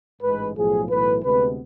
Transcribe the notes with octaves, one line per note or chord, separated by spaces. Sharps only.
A1 G#2 G#3 B4
B1 A2 F3 G#4
B1 A2 E3 B4
D2 C3 G#3 B3 B4